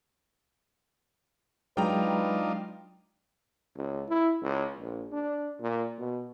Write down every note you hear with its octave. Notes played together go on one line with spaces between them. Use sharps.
F#3 G#3 D4 D#4 F4 B4 G5 A#5
C#2
E4
C#2
A#1
D4
A#2
B2